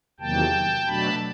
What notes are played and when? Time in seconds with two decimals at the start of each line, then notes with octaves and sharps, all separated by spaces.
0.20 E2 C3 D#3 F#3 A#3 G5 A5
0.86 B2 F#3 A3 D4 A5 B5